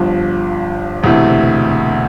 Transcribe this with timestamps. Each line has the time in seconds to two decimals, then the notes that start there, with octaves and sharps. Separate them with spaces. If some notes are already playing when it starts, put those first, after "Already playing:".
Already playing: G1 G2 F3
1.03 E1 D2 C3 E3 A3